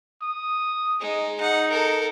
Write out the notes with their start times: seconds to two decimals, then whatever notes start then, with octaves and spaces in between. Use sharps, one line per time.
0.22 D#6
1.01 G#3 D#4
1.41 D#4 F#5
1.71 A4 A#4